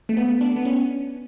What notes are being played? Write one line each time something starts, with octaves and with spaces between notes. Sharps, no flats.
A3
B3
D4
B3
C#4